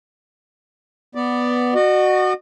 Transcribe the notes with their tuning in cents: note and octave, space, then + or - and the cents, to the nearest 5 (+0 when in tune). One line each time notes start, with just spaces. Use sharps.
B3 +0 D5 +0
F#4 +0 D#5 -45